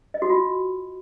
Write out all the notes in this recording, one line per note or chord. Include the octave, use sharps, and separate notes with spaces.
D#5
F#4
F4